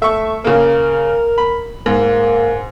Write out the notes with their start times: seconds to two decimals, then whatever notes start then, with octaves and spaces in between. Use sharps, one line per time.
0.02 A3 E5 C#6
0.45 C#3 A#3 A#4
1.38 B5
1.86 G#2 A#3